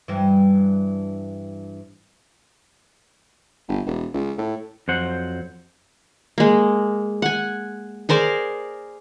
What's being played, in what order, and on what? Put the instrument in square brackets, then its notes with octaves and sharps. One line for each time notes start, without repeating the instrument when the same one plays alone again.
[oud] G2 E3
[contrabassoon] G1
E1
C#2
A2
[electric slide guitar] F2 F#3 C5 F#5
[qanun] G#3 A#3
F#5 G#5
G#4 A#4 C5 D5